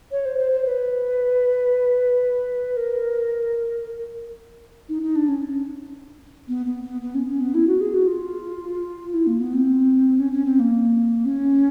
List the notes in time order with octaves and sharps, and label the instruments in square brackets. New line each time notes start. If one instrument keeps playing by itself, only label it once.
[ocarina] C#5
C5
C5
C5
B4
A#4
D#4
D#4
D4
C#4
B3
B3
B3
B3
C#4
C#4
B3
E4
F#4
G#4
F#4
F4
E4
A#3
B3
C4
C#4
C#4
C4
A#3
C#4